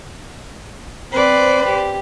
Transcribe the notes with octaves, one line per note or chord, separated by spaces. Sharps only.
C4 B4 C5 D5
G4